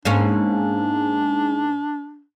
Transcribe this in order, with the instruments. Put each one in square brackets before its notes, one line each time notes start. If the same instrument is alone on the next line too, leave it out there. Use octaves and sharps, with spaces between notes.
[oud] G#2 A#3 C#4 [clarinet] D4